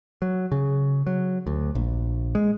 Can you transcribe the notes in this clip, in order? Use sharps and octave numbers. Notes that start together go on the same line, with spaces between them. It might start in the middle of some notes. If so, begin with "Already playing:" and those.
F#3
C#3
F#3
D2
A#1
G#3